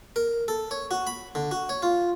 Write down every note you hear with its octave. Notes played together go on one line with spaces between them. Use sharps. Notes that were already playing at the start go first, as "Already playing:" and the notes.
A#4
A4
C#5
F#4
B5
D3
F#4
C#5
F4